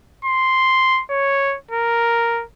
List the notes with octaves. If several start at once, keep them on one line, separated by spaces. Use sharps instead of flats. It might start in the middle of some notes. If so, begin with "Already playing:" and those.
C6
C#5
A#4